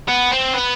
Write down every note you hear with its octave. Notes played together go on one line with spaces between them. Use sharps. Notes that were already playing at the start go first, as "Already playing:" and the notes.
B3
C4
B3